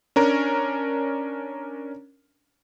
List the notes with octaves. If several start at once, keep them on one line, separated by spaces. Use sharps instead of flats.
C#4 D4 A#4